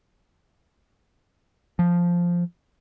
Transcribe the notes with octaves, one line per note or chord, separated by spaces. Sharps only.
F3